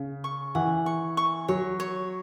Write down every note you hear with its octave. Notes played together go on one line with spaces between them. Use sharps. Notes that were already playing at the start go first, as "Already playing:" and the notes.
Already playing: C#3
C#6
E3 F#5
C#6
C#6
F#3 C#5
C#5